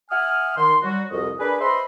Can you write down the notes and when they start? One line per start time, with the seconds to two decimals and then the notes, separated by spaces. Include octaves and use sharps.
0.11 E5 F#5 G#5 D#6 F6
0.57 D#3 C6
0.83 F#3 G3 F#4
1.11 C2 F2 F#4 A#4 D#5
1.40 D4 G#4 A#4 B4
1.61 B4 C5 D#5 E5 B5 C6